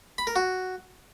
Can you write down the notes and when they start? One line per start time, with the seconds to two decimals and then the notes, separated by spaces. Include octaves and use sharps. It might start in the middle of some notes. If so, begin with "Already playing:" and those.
0.18 B5
0.27 A#4
0.36 F#4